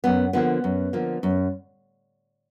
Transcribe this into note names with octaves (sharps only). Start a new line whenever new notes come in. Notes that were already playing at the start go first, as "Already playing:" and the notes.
F#2 B3
D3 F3 A#3 B3
F#2
D3 F3 A#3
F#2